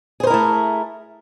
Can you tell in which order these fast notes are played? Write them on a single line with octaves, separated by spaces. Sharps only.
G#4 C5 A#4 E4 A3